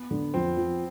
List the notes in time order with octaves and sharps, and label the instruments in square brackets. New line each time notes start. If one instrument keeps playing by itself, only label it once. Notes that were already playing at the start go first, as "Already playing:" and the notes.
Already playing: [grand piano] B3
[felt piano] D3
[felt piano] F2 [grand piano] C4
[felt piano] F3